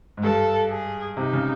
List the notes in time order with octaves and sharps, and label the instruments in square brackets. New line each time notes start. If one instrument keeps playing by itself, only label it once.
[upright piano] G#2
[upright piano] G2 [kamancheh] A4
[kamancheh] G#4
[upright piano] C3 [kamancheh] D#4
[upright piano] C#3